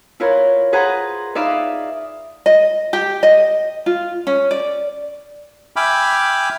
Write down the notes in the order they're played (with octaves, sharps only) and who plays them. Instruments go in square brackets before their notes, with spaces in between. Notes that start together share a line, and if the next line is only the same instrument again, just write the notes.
[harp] E4 F4 A#4 B4 C#5 A#5
G#4 B4 C5 F#5 A#5
D#4 B4 D5 E5 F5 B5
[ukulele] D#5
G4
D#5
F4
C#4
D5
[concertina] E5 G5 G#5 B5 D6 F6